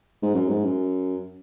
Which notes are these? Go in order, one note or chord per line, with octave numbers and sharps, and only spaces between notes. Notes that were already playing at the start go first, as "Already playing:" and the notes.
G#2
F#2
G#2
F#2